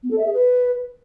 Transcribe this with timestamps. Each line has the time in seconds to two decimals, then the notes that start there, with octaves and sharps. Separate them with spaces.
0.03 B3
0.11 A4
0.18 E5
0.26 G#4
0.33 B4